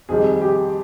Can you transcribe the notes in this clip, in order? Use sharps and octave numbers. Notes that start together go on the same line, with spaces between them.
F2 D#3 G3 G#4
G4